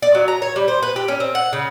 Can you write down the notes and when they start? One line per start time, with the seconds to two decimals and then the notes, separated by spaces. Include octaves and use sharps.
0.02 D5
0.15 F#3
0.28 A#5
0.42 C#5
0.56 G3
0.68 C5
0.83 B4
0.96 G4
1.08 C#4
1.20 C4
1.35 F#5
1.53 C#3